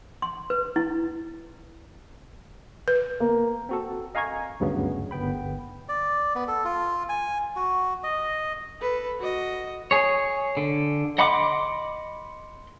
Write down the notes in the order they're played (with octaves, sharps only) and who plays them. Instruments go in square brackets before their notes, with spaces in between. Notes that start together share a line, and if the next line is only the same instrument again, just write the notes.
[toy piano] C6
B4
E4
[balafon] B4
[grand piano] A#3
[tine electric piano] C4 F#4 A4
D#5 F5 G#5 A#5 C#6 G#6
D2 G2 C#3 F#3 B3
G1 B3 G5 B5
[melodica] D5
B3
A4
F4
G#5
F#4
D#5
[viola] A4 B4
F#4 D#5
[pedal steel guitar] G#4 C#5
D3
D#5 F#5 B5 C6 D6